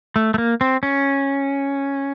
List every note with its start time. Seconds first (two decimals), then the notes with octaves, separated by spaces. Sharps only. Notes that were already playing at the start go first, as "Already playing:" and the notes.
0.16 A3
0.34 A3
0.38 A#3
0.61 C4
0.83 C#4